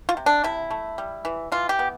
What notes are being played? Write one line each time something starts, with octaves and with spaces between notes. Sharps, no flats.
F4
C3
D4
C3 E4
A3
G3
E3
E3 F4
G4
B3